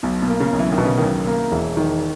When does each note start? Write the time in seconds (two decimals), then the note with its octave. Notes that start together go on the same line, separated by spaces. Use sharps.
0.03 B1 B2
0.22 B2
0.28 A#3
0.40 C#3
0.53 B1
0.59 E3
0.72 D#3
0.78 B2
0.85 C#3
0.98 B1 D#3
1.27 A#3
1.52 E1 E3
1.77 D#3